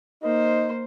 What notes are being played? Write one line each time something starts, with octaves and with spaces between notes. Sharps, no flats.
A#3 D#4 C5